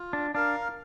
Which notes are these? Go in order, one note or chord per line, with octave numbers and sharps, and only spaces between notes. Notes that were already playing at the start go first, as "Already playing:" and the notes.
Already playing: F4
D4
D4 A#4 F5